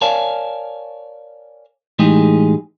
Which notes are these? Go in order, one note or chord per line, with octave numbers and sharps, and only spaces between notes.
A#4 C#5 D5 F5 G#5 A5
A2 E3 G#3 D#4 G4 G#4